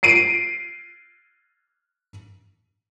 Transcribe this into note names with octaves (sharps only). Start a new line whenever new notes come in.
C7 D7 D#7